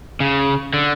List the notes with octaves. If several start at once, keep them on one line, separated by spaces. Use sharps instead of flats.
C#3
D3